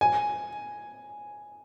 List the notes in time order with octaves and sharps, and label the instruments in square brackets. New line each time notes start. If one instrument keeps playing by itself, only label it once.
[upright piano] G#5